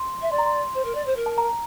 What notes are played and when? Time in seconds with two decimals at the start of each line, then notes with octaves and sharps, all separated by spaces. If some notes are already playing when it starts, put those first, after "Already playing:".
Already playing: C6
0.22 E5
0.31 D5 C6
0.38 A#5
0.46 C6
0.74 C5
0.85 A#4
0.95 D5
1.06 C5
1.16 A#4
1.26 A5
1.38 A#5